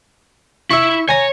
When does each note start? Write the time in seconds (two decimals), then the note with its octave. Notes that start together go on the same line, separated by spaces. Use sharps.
0.71 E4 E5 C#6
1.09 C#5 G#5 A#5